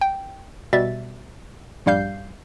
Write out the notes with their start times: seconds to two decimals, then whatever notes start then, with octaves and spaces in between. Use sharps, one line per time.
0.01 G5
0.73 B2 G3 E5 A6
1.86 A#1 G2 G3 F5 G6 C7